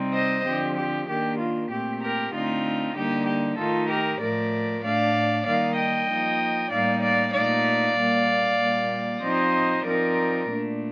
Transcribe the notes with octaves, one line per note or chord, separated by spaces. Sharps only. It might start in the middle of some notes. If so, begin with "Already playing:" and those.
Already playing: C3 G3 C4 D#4
C5 D#5
D3 F3 C4 G4
G4
D#3 A#3 D4 G4
F4
A#2 A3 C4 G4
G4 A#4
D3 A3 C4 D#4 F4
D3 G3 A#3 D#4 G4
G4
D#3 A3 D#4 F4 A4
G4 A#4
A2 F3 A3 A#4 D5
A2 A3 D4 D5 F5
D#3 G3 A#3 D#4 D5 F5
D#5 G5
F3 A#3 D#4
A2 G3 A#3 D#4 D5 F5
D5 F5
A#2 A3 D#4 D5 F5
A#2 G3 A#3
A#2 G3 A#3
F3 C4 D#4 C5 D#5
F3 C4 D#4 A#4 D5
A#2 A3 D4